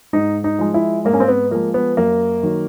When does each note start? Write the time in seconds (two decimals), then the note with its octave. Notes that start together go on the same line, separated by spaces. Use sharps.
0.13 G#2 D#4
0.44 D#4
0.59 F3 G#3
0.74 E4
1.05 G#2 A#3
1.13 C#4
1.20 C4
1.28 B3
1.51 F3 G#3 A#3
1.74 B3
1.97 F#2 A#3
2.43 D#3 F#3